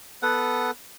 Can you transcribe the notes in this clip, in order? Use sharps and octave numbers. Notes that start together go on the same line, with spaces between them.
B3 A4 B4 F#5